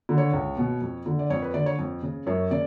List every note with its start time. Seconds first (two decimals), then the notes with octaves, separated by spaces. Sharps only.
0.09 D3
0.18 C#5
0.33 C#2
0.57 B2
0.81 F2
1.06 D3
1.19 D5
1.30 F2 C#5
1.42 B4
1.54 D3 D5
1.66 C#5
1.78 F2
2.03 C#3
2.26 F#2 C#5
2.51 C#3 D5